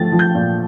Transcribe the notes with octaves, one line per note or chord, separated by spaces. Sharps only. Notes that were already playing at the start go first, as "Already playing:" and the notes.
Already playing: F3 A3 A6
F3
G6
A#2